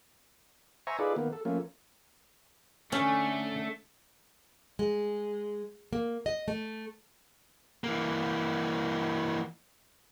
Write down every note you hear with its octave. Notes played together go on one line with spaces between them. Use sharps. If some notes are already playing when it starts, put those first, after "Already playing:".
C5 E5 G#5 A#5 C#6
D#4 F4 G#4 A4 B4 D5
D#3 A#3 B3
A4
F3 A3 A#3 C#4
D3 A3 C#4
G#3
A#3
D#5
A3
E3 A#3